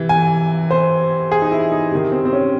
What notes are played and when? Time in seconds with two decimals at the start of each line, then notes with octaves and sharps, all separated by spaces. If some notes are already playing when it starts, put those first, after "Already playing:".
Already playing: C3 E3
0.09 G#5
0.71 C5
1.32 G#4
1.42 D#4
1.52 E4
1.72 D#4
1.91 C3 D#3
2.12 C4
2.25 C4
2.33 C#4